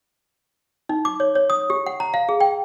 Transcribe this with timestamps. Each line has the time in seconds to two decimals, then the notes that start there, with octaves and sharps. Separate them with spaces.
0.89 D#4
1.05 D6
1.20 C#5
1.35 C#5
1.50 D#6
1.70 G4
1.86 F#5
2.00 A#5
2.14 F5
2.29 G#4
2.40 G5